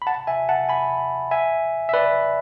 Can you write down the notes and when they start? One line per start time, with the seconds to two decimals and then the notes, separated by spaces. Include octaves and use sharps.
0.02 B5
0.07 F#5 A5
0.27 E5 G#5
0.49 F#5 A5
0.69 G#5 B5
1.31 E5 G#5
1.89 E5
1.94 B4 D5